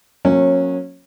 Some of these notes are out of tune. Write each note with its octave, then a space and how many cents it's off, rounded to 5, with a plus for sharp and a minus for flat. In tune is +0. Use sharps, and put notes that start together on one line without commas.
F#3 -30 A#3 -5 C#4 -20